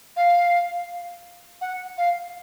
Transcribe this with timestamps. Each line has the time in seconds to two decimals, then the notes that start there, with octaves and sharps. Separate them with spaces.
0.16 F5
1.61 F#5
1.98 F5